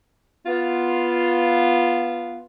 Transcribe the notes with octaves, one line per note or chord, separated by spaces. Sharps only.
B3 F4